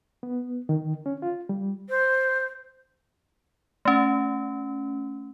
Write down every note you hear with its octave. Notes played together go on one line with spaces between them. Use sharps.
B3
D#3
C#4
F4
G3
C5
A3 C#4